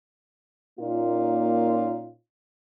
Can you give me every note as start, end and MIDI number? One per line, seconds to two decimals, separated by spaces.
0.80 2.15 46
0.80 2.15 58
0.80 2.15 61
0.80 2.15 63
0.80 2.15 65